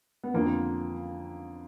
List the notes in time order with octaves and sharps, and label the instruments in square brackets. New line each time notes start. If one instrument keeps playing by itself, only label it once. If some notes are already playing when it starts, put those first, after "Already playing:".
[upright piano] B3
F2 D3 F3 A#3